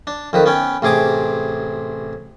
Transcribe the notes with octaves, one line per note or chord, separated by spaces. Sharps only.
D4
F2 D#3 B4
B3 C#4 G5
A1 C3 G#4 D6 D#6